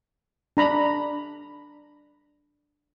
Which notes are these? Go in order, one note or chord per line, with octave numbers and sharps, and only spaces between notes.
D4 A#5 B5